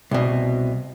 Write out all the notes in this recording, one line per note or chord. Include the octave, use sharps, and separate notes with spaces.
C2 B2